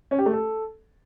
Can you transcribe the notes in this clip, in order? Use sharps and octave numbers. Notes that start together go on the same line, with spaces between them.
C#4
G4
A3
A4